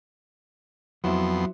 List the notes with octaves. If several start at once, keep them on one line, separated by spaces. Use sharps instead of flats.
F2 F#3 B3 E4 C5 C6